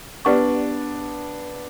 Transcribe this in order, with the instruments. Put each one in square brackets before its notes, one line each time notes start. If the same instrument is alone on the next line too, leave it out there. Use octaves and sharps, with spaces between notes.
[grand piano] B3 D4 [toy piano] G4 B4 D5 F#5 C#6